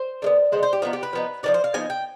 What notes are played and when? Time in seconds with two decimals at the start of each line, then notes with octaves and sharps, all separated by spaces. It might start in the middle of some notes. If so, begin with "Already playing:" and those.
Already playing: C5
0.22 D3 G#3 B3
0.52 D3 G#3 B3 C5
0.63 C5
0.73 G4
0.82 F3 B3 D#4 F4
0.93 G4
1.03 B4
1.13 F3 B3 D#4
1.43 F3 B3 D#4 D5
1.54 C5
1.64 F5
1.74 F3 B3 D#4 G#5
1.90 G5